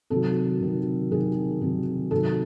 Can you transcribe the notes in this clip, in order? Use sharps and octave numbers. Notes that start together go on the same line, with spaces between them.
C3 D#3 F#3 A4
C3 D#3 F#3
C3 D#3 F#3 G#4
C3 D#3 F#3
C3 D#3 F#3 A4